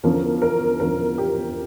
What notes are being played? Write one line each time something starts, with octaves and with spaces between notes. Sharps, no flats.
E2 D3 F3 C#4 A#4
A#4
E2 D3 F3 C#4 A#4
G4